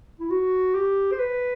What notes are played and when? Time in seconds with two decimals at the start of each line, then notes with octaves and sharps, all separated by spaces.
0.20 E4
0.30 F#4
0.75 G4
1.12 C5
1.19 B4